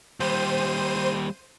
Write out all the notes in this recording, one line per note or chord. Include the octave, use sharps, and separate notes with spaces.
D#2 G3 C5 D#7